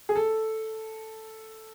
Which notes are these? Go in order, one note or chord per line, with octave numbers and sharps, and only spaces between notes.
G#4
A4